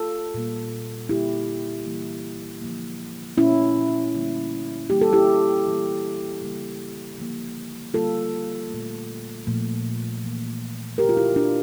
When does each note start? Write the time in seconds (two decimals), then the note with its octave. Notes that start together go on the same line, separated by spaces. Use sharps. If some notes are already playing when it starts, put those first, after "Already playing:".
Already playing: F4 A4
0.34 A#2 G3 A#3
1.09 D3 G3 A#3 E4 G4
1.86 E3 G3 A#3
2.62 D3 F3 A#3
3.38 A#2 A3 C#4 E4
4.15 D3 G3 A#3
4.90 E3 G3 A#3 G4
5.01 A4
5.12 E4 G4
5.67 E3 G3 A#3
6.42 C#3 G3 A#3
7.18 D3 F3 A#3
7.94 D3 G3 A#3 F4 A4
8.70 A#2 A3
9.47 A#2 F3 A3
10.23 E3 A#3
10.98 D3 A3 G4 A#4
11.09 F4
11.17 E4 G4
11.36 D4 F4